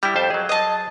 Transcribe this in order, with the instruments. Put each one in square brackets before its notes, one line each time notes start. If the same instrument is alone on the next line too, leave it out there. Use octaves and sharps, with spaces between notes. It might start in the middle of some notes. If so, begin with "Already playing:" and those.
[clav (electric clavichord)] G3 E4 [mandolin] G4
[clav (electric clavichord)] F2 C5 A5
F#3 G#4
[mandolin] D#5 A5